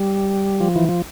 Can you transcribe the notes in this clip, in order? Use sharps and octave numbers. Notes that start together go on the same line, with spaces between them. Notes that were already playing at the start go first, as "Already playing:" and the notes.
Already playing: G3
F3
E3
F3